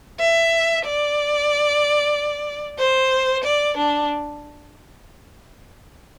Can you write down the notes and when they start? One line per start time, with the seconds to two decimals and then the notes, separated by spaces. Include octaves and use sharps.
0.20 E5
0.85 D5
2.79 C5
3.44 D5
3.77 D4